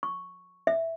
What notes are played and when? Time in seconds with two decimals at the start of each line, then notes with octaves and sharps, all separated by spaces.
0.03 C#6
0.67 E5